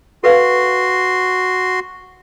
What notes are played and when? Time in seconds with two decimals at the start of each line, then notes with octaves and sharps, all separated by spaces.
0.24 F#4 A4 B4 F5 C6